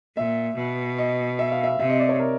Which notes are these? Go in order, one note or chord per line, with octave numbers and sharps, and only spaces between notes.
A#2 E5
B2
D#5
E5
F5
E5
C3 E5
D#5
D5
C#5
A#4